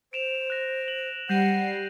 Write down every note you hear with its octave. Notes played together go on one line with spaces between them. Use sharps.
C5 D7 E7 F7
F#6 A#6
F#7
G3 F#5 G6 A#6 C7 D#7